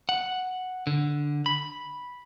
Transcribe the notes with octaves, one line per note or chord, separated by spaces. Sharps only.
F#5
D3
B5